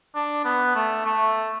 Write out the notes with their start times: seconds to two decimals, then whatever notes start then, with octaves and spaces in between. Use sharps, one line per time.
0.15 D4
0.45 B3
0.75 A3
1.05 A3